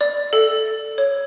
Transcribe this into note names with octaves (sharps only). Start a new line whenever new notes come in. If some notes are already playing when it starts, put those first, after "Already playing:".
D5
A4
C#5